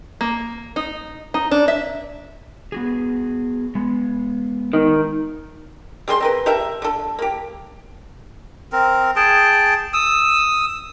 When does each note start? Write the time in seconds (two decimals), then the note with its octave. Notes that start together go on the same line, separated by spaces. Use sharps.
0.21 A#3
0.76 D#4
1.34 D#4
1.51 D4
1.68 E5
2.72 B3 F#4 G#4
3.75 G#3 B3
4.73 D#3
6.08 G3 G#4 B4 C6
6.20 C4 A#4 B4
6.46 G4 A4 A#4 E5
6.82 D3 A4
7.19 A#3 G4
8.72 C4 A#4
9.16 G#4 G5 A5
9.93 D#6 E6